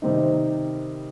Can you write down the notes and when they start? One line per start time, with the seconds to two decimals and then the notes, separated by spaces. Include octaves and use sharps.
0.02 C3 D#3 G3 C4 D#4